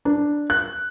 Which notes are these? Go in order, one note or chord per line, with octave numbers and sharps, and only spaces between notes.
D4
F#6